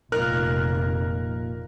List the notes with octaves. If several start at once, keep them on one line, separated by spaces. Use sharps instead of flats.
F1 A#2 D#4 A#4 F6 F#6